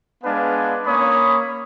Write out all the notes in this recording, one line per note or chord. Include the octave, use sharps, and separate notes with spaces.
G#3 B3 D4 B4 F5 G#5
A#3 C#4 C#5 B5 D#6